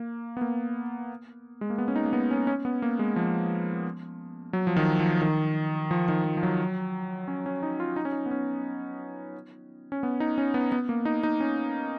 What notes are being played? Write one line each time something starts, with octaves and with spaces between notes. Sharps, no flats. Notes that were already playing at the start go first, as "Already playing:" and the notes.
Already playing: A#3
B3
A#3
G#3
A#3
B3
C#4
D#4
A#3
B3
C#4
C#4
B3
A#3
G#3
F3
F#3
F3
D#3
F3
D#3
F3
D#3
F3
F3
F#3
C#4
C#4
D#4
F4
D#4
C#4
D#4
B3
C#4
C#4
B3
D#4
C#4
B3
B3
A#3
D#4
D#4
C#4